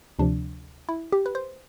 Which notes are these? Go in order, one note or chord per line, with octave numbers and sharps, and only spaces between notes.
D2 C3 F3 D4
E4
G4
B4
C5